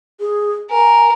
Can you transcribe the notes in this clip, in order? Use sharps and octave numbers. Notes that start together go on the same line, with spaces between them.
G#4
A#4 G#5